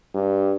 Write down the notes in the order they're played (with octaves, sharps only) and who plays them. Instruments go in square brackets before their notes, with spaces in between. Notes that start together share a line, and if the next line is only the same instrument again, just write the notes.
[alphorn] G2